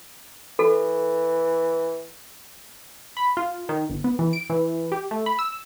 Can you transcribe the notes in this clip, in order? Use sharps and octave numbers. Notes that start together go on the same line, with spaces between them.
E3 A4
B5
F4
D#3
G1
B3
E3
D7
E3
G4
A3
B5
E6